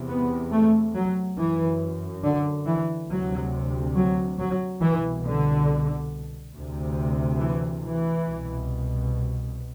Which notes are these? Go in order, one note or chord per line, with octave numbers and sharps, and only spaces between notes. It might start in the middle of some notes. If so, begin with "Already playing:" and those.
Already playing: E2 C3
B3
A3
F#3
F#2 E3
D3
E3
D2 C3 F#3
F#3
F#3
C2 B2 E3
D3
D2 C3
E3
E3
C2 B2